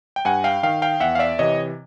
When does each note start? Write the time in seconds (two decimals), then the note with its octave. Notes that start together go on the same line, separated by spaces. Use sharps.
0.16 G5
0.25 G2 F#5 G#5
0.44 F5 G5
0.63 D#3 F5 G5
0.82 F5 G5
1.00 E2 E5 F#5
1.15 F5
1.19 D5 E5
1.39 C3 E3 C#5 D#5